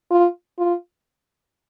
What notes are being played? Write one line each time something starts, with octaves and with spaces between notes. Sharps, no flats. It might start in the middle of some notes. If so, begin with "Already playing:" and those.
F4
F4